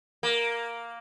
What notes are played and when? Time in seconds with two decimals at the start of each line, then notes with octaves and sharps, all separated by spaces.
0.23 A#3